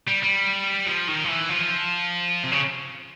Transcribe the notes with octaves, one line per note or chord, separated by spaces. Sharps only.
G3
G3
F3
D#3
F3
E3
F3
C3
C#3